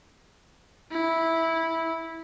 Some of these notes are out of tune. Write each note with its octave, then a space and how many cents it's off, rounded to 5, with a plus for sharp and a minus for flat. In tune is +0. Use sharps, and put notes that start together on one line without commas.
E4 -10